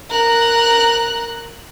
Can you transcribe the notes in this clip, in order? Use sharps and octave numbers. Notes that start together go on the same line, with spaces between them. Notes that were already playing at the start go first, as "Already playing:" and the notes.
A#4 F#6